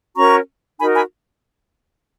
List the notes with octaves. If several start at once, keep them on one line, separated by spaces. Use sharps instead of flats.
C#4 F#4 A#4 A#5 C#6
D#4 F#4 A#4 G#5 B5
G#5 B5